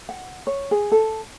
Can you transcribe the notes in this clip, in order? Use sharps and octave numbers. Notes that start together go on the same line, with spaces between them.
F#5
C#5
G#4
A4